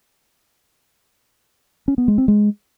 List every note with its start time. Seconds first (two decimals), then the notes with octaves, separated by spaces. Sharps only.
1.88 C#4
1.98 B3
2.08 G#3
2.18 C4
2.28 G#3